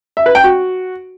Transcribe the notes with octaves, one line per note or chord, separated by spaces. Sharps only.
E5
B4
G5
F#4